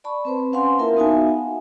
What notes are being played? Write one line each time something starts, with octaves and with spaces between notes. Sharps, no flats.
D5 A5 B5 C#6
C4 B4 C5
C#4 B4 F5 F#5 G#5 C6
A#3 E4 F4 A#4 E5 A5
B3 D#4 F#4 E5 F5 G#5
F#5 G#5